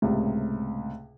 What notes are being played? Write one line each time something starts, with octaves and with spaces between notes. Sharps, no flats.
C#2 A2 C3